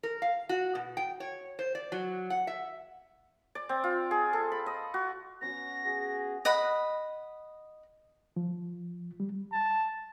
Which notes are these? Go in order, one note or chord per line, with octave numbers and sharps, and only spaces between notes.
A#4
F5
F#4
B2
G5
C#5
C5
D5
F#3
F#5
E5
D5
C4
F4
G#4
A4
B5
D#5
F#4
B3 C#4 F#4 A#6
F#4 G#4
D#5 F#5 B5
F3
G3
A5